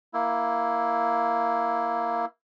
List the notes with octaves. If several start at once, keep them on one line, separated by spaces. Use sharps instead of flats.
A#3 E4